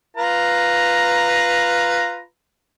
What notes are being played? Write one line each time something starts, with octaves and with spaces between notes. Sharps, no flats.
F4 B4 A#5